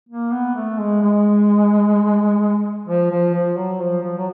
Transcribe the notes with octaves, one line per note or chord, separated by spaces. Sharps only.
A#3
B3
A3
G#3
G#3
F3
F3
F3
F#3
F3
F3
F#3